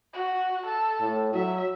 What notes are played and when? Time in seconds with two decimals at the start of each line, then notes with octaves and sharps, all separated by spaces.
0.13 F#4
0.66 A4
1.01 A2
1.34 F#3 E5